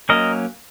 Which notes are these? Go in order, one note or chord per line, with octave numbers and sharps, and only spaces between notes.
F#3 A#3 C#4 A#4 D#5